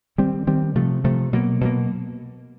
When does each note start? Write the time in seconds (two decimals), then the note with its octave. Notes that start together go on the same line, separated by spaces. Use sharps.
0.18 D#3 G3 C4
0.47 D#3 G3 C4
0.75 C3 F3 A3
1.04 C3 F3 A3
1.33 B2 F#3 A#3
1.61 B2 F#3 A#3